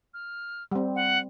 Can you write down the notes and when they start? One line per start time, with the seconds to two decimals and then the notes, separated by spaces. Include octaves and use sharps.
0.14 F6
0.71 G3 C4
0.95 F#5